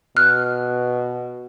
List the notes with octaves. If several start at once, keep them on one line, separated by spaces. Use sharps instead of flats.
B2 F6 F#6